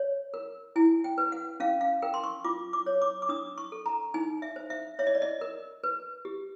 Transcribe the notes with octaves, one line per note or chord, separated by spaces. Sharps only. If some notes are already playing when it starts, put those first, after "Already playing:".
Already playing: C#5
A#4
E4 G#5
G5
B4
F#5
C#4 F5
F5
A#4 G5
C6
C#6
F4 D6
D6
C#5
D6
D6
D4 D#6
C#6
A4
A#5
D#4 G#5
E5
C5
E5
C#5 E5
D#5
D5
D#5
A#4
B4
G4